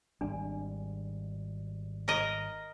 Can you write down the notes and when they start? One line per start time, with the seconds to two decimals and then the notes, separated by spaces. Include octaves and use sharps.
0.21 G#1 G3 D4 G#5
2.08 A#4 D#5